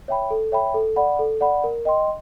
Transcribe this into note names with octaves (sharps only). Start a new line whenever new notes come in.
C#5 E5 G5 B5
A4
C#5 E5 G5 B5
A4
D5 F#5 B5
A4
D5 F#5 B5
A#4
D#5 G5 C6